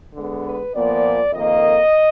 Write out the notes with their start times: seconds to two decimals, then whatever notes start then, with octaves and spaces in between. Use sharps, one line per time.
0.13 D3 G#3 B3
0.43 B4
0.73 A#2 F3 B3 D5
1.32 F2 D#3 A#3 D#5